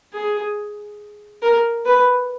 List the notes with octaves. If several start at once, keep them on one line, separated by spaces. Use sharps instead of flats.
G#4
A#4
B4